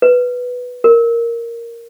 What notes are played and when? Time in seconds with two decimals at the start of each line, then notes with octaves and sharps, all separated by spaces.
0.02 B4
0.84 A#4